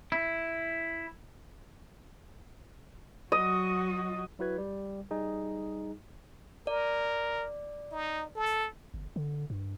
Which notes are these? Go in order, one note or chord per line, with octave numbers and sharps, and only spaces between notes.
E4
F#3 F#4 D#5
F#3 E4 F#4 B4 G#6
G3
G3 D#4 G#4
A#4 D5
D#4
A4
G1
D3
G2